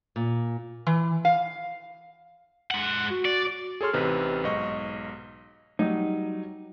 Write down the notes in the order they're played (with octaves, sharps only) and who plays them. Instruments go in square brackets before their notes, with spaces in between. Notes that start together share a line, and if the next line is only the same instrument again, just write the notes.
[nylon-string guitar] A#2
[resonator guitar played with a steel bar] E3
F5
[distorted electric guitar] G#3 F#5
[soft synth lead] F#4
[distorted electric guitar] D5
[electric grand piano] G#4 A4 C#5 C6 F6
A1 C3 D#4 B4
B1 G#2 D#5 C#6
[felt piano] F#3 G3 [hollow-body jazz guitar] D#4